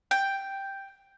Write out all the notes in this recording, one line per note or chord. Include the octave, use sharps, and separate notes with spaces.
G5